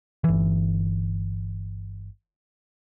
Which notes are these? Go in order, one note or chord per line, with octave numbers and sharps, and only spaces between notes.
G1 E3